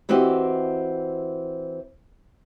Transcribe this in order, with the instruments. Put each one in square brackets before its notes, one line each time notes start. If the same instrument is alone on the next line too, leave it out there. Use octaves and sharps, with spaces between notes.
[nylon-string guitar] E3 C4 F#4 G4 D#5